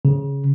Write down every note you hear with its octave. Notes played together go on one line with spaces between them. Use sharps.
C#3